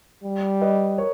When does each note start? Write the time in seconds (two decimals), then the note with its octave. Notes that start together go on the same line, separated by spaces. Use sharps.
0.24 G3
0.61 B4 D#5
0.98 A#4 C#5